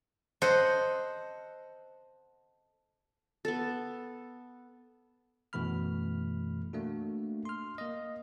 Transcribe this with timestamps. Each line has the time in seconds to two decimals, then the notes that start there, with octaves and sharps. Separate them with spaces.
0.42 A4 C5 D#5 F#5
3.45 B3 A4
5.53 F#2 B2 E3 A3 B5 F6
6.73 A3 A#3 D4 F#4
7.45 C6 F6
7.78 A#3 D#5